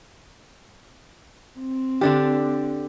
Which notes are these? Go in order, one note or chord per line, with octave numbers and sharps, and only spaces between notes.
C4
D3 D4 G4